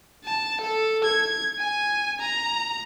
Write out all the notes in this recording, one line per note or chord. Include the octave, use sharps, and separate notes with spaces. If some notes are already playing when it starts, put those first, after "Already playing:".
A5
A4
G#6
G#5
A#5